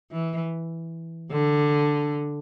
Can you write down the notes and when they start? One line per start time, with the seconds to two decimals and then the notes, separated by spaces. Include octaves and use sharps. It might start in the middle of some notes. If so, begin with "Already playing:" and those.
0.12 E3
1.31 D3